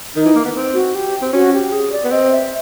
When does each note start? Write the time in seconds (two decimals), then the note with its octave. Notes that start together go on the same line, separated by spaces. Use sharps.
0.16 D#3 D#4
0.26 E3
0.36 A#3
0.45 B3
0.56 C4
0.74 F#4
0.95 G4
1.22 C4
1.33 C#4 F#4
1.53 G4
1.72 G#4
1.92 D5
2.04 B3
2.11 C4 D#5
2.31 E5